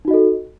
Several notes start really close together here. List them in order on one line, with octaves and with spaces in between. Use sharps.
D#4 F#4 D#5 A4